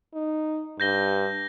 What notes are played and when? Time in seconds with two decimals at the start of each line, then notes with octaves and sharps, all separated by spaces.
0.14 D#4
0.80 G2 G6 A#6 G7